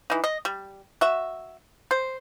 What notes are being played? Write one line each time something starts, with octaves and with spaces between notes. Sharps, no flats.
E3 D#4
D#5
G3
F#4 E5
C5